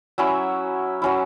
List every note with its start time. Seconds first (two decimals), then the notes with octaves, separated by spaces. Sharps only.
0.18 F#3 C#4 E4 E5
1.02 F#3 C#4 E4